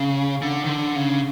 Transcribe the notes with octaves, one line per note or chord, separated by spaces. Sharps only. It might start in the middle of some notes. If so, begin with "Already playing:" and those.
Already playing: C#3
D3
D#3
D3
C#3